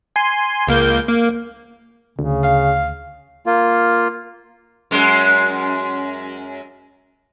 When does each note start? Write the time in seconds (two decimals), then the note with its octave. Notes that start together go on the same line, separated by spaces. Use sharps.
0.16 G#5 C6
0.68 C#2 A#3 G6
1.09 A#3
2.19 D2 C#3
2.43 F5
3.46 A#3 F4
4.91 F#2 G#3